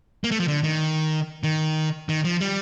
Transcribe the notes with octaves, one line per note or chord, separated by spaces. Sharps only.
A#3
A3
F3
D3
D#3
D#3
D#3
F3
G3